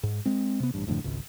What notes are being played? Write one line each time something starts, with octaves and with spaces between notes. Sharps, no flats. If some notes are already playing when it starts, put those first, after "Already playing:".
G#2
G#3 C4
C3 B3
A1 G2
E1 F2 A2 D3
G#1 C#2